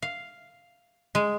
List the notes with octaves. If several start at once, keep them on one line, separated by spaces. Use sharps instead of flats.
F5
G#3